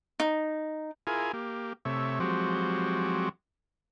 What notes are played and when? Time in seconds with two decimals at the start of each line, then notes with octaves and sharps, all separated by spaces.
0.20 D#4
1.07 E4 F4 G#4 A#4 G#5
1.33 A#3 G4
1.85 C3 A3 C#5 E5
2.20 F3 F#3 G#3 C4 F#4 G4